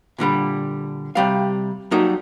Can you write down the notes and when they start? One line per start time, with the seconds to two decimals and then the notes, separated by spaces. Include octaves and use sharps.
0.18 A#2 D3 G3 B5
1.15 C3 G3 F5
1.91 F#3 G3 A#3 D#4 A4